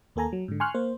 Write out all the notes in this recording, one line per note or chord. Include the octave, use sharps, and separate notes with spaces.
D#2 A#3 A4 G#5 A#5
F#3
G#2 D3
G#5 C6 C#6 F6 F#6
A#3 C5